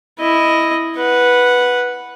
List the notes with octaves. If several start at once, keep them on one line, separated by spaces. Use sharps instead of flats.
E4 D#5
B4 F#5